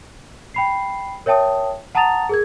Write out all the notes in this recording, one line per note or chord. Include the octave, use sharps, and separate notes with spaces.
G5 B5 C7
A#4 C#5 E5 G5 A5 D#6
F#5 A5 A#5 D#6 A6 F7
G#4 A#4 G#6